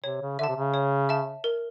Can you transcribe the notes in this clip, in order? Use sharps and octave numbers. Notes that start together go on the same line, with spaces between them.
C3 C#5
C#3
D3 E5 A5
C3
C#3
C#5
E5 A5
A#4